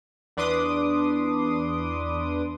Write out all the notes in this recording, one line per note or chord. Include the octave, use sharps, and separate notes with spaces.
E2 D4 B4 C6 D6 D#6